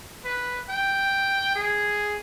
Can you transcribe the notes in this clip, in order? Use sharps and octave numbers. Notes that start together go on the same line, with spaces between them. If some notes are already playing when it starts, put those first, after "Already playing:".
B4
G5
G#4